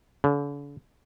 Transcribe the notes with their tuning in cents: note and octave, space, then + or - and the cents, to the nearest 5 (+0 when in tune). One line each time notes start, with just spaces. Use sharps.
D3 -45